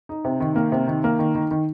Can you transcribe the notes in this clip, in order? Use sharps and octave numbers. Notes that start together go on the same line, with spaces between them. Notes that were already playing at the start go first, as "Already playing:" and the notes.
D#4
C3
D#3
A#3
C3
D#3
A#3
D#3
D#3
D#3